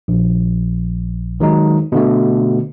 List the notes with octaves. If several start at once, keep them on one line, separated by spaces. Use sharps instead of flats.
A#1
D#3 F#3 G#3 D#4
B2 D3 A3